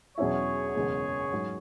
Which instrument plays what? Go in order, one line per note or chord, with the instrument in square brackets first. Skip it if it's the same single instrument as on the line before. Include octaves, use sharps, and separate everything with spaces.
[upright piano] E2 B2 F#3 C#4 E4 [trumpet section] G#4 C#5
[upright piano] F#1 E2 B2 G#3
G#2 F#3